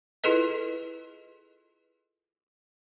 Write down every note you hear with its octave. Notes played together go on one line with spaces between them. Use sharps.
E4 F4 G#4 A4 B4 D#5